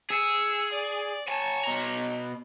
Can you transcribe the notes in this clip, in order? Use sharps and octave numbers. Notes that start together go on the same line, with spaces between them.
G#4 E6 C#7
D5
C#5 G#5 A5
B2 A#5